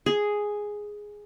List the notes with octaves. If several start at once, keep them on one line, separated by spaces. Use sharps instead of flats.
G#4